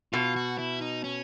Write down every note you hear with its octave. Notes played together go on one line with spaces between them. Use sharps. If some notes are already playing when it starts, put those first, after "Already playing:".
B2 F4
F#4
E4
D#4
C#4